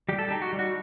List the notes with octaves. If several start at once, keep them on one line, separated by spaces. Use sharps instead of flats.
G3 G4
A4
D#4 G4
F#4
G3
F#4